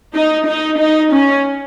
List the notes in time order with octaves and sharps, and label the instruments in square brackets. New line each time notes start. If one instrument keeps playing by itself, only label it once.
[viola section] D#4
D#4
D#4
C#4